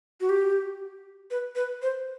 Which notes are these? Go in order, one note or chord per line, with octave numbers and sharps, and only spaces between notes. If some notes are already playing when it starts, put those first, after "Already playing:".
F#4
G4
B4
B4
C5